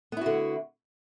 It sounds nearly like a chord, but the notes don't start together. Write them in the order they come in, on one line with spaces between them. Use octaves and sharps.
B3 E4 F#4 D3